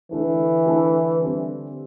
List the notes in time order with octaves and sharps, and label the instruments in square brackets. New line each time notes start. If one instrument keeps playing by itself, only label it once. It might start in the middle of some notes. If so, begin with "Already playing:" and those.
[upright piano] D3 A3 E4 A4 [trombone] E3
[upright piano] D3 A3 E4 A4
D3 G3 C4